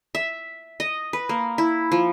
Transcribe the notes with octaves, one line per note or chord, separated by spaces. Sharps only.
E5
D#5
B4
A#3
E4
F3